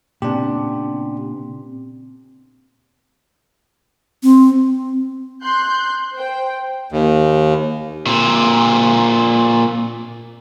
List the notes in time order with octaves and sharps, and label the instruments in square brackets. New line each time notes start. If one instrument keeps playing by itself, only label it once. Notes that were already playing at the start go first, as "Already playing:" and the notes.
[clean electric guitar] A#2 C#3 B3 [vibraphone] C4 [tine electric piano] D4 G4
[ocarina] C4
[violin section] C6 F#6 G6
C5 G5
[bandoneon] D#2
[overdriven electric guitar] A#2 C4